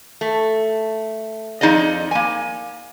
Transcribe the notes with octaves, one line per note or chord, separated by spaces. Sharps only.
A3
F2 D#4 G#4 D5 D#5
A#3 G#5